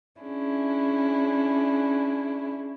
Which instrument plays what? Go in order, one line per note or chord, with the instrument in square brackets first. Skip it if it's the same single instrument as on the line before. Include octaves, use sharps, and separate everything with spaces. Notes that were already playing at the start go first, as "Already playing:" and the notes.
[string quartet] C#4 D4 E4 G#4